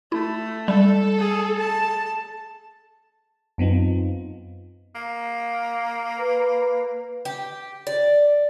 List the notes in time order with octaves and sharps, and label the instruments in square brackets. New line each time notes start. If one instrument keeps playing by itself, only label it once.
[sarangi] A3 [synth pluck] E4
[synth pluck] G3 [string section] A4
[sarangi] G#4
A5
[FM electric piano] F#2 B3 C4 D#4 F4
[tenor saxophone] A#3
[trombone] B4
[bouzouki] G4
D5